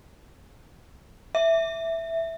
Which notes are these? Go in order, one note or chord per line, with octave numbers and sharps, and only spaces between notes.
E5